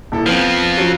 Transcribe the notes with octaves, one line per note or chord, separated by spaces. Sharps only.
D#1 E4 A4
F2 F3 B3 C4
F#3 C#4 F4